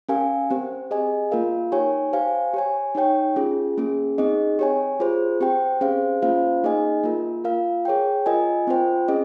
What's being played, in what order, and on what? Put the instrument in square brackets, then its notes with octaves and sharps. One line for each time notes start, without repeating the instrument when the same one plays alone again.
[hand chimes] C#4 G4 A#4 F5 G#5
C4 G4 C5
G#4 D#5 G#5
A#3 F4 A#4 F5
D#4 G4 C#5 G#5
G4 C5 F5 G#5
G4 C#5 G#5
D#4 G4 C#5 G5
C#4 F4 G#4
A#3 C#4 G#4
C4 D#4 G#4 D#5
G4 C#5 G#5
F4 G#4 C5
C4 G4 C5 G5
C#4 G#4 C5 F5
A#3 C#4 F4 C5 F5
A#3 D#4 G#4 D#5 G#5
A#3 F4 A#4
F4 A#4 F5
G#4 C#5 G5
F4 A#4 D#5 G#5
C4 F4 C5 G5
C#4 G#4 D#5